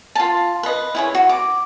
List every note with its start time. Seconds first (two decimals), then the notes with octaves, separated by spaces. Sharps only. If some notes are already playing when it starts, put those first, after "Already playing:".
0.15 F4 A5
0.63 B4 D#5
0.95 E4 G#4 C#5
1.15 F#4
1.29 D6